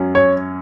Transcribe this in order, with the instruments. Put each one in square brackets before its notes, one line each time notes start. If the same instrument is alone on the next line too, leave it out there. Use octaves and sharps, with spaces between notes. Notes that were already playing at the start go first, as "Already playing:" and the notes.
Already playing: [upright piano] F#2 F#3 C#4
[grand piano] C#5